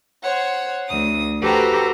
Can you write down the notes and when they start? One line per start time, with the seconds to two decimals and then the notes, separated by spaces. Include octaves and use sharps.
0.23 C5 C#5 F#5
0.87 D2 D#6
1.43 F#4 G4 A4 B4 C5 A#5